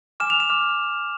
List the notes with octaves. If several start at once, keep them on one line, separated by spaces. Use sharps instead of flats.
G#5 D6 F6 E7
F7
E7
D6 F6